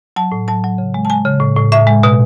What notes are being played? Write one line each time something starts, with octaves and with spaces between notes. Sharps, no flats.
F#3 A5
A2
F#3 A5
F#3
C#3
G#3
A5
G#3 G#5
C#3
A2
A2
A2 E5
G#3
B2